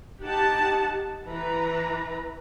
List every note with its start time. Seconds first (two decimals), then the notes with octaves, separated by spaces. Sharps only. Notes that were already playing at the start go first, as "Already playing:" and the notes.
0.21 D#4 G4 F#5 A5
1.26 E3 B4 A#5